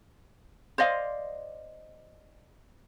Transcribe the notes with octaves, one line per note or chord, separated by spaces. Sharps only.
C5 D5 D#5 F5